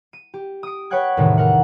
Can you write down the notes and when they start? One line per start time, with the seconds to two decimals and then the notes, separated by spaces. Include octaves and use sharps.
0.13 D#7
0.34 G4
0.63 D#6 D7
0.90 B4 C#5 F#5 G5 F#6 G#6
1.17 E2 A2 C3 D#3 G#3
1.38 A#4 F#5